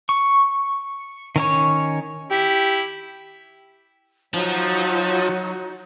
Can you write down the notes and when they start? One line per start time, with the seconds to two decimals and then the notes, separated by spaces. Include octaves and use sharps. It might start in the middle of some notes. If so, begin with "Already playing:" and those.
0.09 C#6
1.36 D#3 C#4 C#5
2.31 E4 G4
4.34 F3 F#3 D#4 F#4 C#5